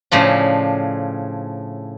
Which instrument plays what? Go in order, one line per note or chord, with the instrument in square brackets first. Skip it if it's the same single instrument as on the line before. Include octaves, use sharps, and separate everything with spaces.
[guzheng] A2 C#3 F3 D4